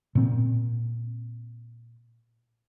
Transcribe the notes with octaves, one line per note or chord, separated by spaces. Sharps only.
A#2 C4